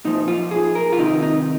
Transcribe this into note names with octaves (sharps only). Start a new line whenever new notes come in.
A#2 F3 D#4
F4
G#4
A#4
F4
C3 D#3 D#4
D#4